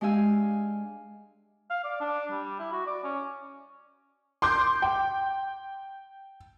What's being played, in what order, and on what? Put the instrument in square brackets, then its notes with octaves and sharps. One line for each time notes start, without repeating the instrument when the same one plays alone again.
[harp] G#3 D4 G4 F5 G#5 E6
[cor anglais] F5
D5
D4
G3
E4
F#4
D5
C#4
[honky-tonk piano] C6 D6 G6
G5